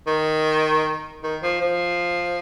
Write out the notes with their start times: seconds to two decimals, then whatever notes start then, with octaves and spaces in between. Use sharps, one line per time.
0.07 D#3
1.23 D#3
1.42 F3
1.61 F3